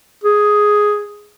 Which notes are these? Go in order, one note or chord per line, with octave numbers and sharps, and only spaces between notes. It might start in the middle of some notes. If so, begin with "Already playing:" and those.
G#4